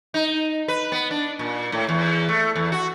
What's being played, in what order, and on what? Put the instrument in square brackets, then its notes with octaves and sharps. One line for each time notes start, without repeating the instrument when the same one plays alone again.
[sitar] D#4
B4
B3
D4
A#2
A2
E2
A3
E2
F#4